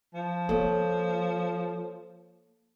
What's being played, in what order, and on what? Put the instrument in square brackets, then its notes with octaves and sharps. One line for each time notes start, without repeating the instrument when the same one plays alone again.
[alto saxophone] F3
[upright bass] A#3 [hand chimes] A4 C#5